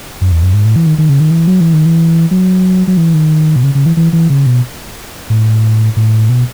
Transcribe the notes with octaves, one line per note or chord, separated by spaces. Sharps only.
F#2
E2
F#2
G#2
A2
E3
D#3
D#3
C#3
D#3
E3
F#3
E3
D#3
E3
F#3
F#3
E3
D#3
B2
C#3
C#3
E3
E3
E3
C#3
B2
A2
A2
B2